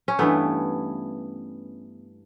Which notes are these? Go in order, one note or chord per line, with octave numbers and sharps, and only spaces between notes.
C#4
G2 E3 A3 B3